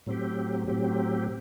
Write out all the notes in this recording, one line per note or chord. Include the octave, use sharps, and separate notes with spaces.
A2 F#3 C4 G4
A2 F#3 C4 G4